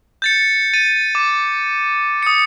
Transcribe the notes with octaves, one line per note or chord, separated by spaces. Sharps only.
G6 A6 C#7
A6 D#7
D6
D#6 C#7